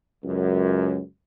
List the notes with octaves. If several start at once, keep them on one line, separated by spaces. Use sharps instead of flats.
C#2 F#2